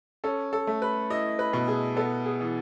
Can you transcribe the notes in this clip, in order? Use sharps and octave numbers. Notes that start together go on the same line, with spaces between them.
C#4 A4
A4
A3
B4
E4 D#5
B4
B2
G#4
B3 A4
G#4
E3